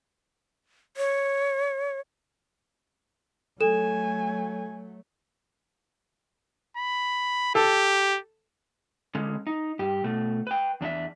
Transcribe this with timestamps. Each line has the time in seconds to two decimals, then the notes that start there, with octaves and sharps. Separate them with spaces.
0.97 C#5
3.60 F#3 A3 A4 G#5 E7
6.77 B5
7.55 G4 A4
9.15 D3 G#3 C#4
9.47 D#4
9.79 G2 G4
10.04 B2 A3
10.47 B4 G5
10.81 E2 D4 D#4 E5